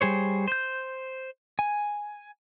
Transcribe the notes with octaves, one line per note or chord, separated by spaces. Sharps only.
G3 G#4 C5 C#5
C5 G6
G#5